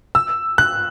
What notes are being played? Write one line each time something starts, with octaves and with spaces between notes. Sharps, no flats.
E6
F#6